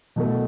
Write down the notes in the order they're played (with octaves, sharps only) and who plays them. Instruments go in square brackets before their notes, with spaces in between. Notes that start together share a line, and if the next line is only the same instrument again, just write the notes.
[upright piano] B2 F#3 A3